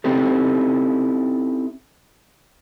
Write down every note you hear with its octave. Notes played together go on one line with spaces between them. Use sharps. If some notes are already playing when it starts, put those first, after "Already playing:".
C4 C#4 D#4 E4 G4 A4